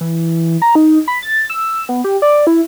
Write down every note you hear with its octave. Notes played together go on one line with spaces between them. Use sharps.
E3
A#5
D#4
B5
A6
E6
B3
G4
D5
E4